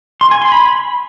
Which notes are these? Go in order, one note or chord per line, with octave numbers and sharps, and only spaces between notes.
C6
G#5
C6
B5